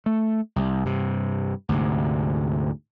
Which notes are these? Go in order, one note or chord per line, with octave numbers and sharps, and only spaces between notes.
A3
C2
G2 C3
D2 G#2 C3